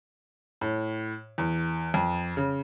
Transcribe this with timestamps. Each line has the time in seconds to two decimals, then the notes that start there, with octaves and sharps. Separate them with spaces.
0.61 A2
1.38 E2
1.94 F2
2.37 C#3